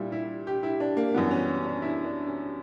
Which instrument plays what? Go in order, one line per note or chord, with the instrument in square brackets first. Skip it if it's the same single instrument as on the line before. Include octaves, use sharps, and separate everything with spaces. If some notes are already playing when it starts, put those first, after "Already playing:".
Already playing: [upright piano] A#2 G3 E4
E4
G4
E4
D4
A#3
F#2 E3 G3 B3
C#4
C#4
D4
E4
D4
C#4